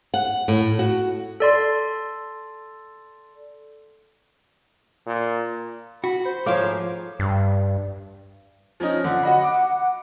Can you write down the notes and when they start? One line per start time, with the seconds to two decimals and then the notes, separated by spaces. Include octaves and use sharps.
0.14 F#5
0.48 A2
0.79 F#4
1.40 A4 D5 C6
5.06 A#2
6.04 F#4 B5
6.25 C5
6.46 G#2 F3 A3 C#5 F5 D6
7.19 G2
8.80 F3 C#4 D#4
9.04 D3
9.23 F#4 D#5 F#5 B5
9.43 D6